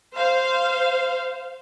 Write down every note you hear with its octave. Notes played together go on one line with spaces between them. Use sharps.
C5 F5